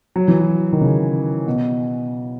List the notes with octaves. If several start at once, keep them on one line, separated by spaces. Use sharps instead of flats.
F#3
E3
F#3
D#3
C#3
B2